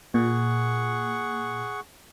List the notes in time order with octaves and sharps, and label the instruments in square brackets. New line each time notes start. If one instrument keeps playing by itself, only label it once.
[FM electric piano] A#2 [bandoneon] G#4 F#5 C#6